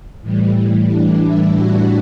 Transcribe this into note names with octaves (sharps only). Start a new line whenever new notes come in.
A2 E3 G3
D4
E4
D4 F#4